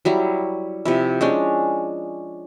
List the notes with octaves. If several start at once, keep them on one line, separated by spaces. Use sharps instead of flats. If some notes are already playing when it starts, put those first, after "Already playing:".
F#3 G3 E4
C3 F3 E4
G#3 C#4 D4